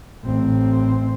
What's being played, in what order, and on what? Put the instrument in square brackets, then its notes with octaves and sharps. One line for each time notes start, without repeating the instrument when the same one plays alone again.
[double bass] A1 C4